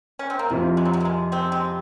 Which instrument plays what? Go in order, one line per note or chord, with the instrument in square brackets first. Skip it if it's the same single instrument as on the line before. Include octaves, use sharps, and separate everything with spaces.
[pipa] C#4
C4
A#3
[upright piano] F2 C3 F3 C4 F4 [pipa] G#3
[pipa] G#3
F#3
G#3
A#3
G#3
G#3 C4
G#3 C4